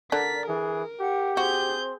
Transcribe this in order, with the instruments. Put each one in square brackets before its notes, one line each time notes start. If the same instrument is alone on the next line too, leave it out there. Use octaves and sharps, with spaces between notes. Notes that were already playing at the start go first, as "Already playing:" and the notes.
[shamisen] D3 D4 [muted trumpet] A#4 [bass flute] D5 [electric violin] B6
[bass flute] E3 [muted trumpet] G#4 [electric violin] A#4
[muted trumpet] G4 [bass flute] F#5
[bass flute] C4 [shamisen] F#4 [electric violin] G#4 G6